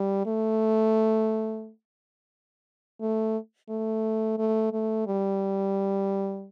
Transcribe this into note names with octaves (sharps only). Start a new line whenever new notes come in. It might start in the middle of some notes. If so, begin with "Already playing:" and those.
Already playing: G3
A3
A3
A3
A3
A3
G3